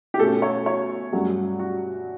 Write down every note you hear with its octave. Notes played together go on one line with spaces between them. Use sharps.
G4
B2 A3 C#4 A4
C#5
C#5
G2 F#3 A3 C#4
F#4